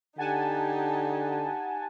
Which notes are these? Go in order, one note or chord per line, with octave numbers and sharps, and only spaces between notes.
D3 D#4 G4 F#5 G#5 A5